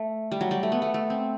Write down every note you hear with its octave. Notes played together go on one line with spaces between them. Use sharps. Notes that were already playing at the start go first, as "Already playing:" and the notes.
Already playing: A3
G3
F#3
G3
A3
B3
A3
A3
C4